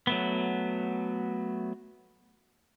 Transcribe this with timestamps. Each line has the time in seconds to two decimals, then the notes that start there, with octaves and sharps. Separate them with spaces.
0.07 F#3 A3 B3